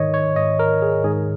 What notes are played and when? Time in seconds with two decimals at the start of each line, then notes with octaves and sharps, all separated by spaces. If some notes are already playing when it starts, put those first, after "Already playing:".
Already playing: G#2 D#3 C#5 D#5
0.14 C#5
0.36 G#2 D#3 D#5
0.59 A#4
0.82 G#4
1.04 G#2 D#3 G#4